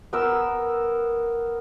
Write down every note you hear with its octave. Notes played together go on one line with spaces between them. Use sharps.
B3 A#4 E6